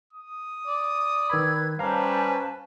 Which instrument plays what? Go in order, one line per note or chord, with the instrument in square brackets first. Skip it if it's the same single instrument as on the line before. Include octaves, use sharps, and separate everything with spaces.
[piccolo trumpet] D#6
[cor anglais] D5
[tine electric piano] D#3 B5 [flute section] B4 E6 G#6
[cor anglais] G3 [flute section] C#4 C5 A5 [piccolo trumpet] B4 [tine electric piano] F5 A#5